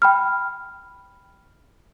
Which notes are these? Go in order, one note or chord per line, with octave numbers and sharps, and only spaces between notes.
G5 B5 F6